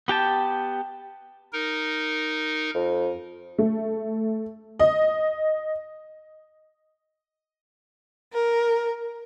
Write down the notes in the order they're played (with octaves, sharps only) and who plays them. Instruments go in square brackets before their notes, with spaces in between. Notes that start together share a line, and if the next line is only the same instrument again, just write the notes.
[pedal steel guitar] B3 G4 G5 A5
[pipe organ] D#4 A#4
[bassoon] F2
[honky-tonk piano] A3
D#5
[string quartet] A#4